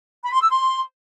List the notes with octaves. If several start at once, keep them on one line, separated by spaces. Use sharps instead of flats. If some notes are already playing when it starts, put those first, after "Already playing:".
B5
C6
E6
C6